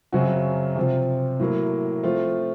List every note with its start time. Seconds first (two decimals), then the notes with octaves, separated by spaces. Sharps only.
0.12 F#2 C#3 F#3 C4 F#4
0.76 C3 F3 C4 F4
1.39 A2 F#3 A#3
2.03 F3 A3 C4 F4